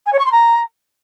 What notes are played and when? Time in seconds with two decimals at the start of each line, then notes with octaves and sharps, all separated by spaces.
0.06 G#5
0.12 C#5
0.19 C#6
0.25 C6
0.31 A#5